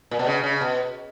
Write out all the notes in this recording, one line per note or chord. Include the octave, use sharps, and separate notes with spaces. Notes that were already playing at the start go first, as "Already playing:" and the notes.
A#2
B2
C#3
C#3
B2